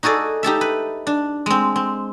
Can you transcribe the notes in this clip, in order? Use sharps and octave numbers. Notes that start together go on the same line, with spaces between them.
D#4 F#4 G#4 A4 D5
D#4 G4 A4 E5
B4
D4
G#3 C4
C4